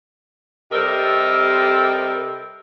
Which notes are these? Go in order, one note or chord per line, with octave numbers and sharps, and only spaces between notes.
C3 G3 C4 A4 A#4 D#5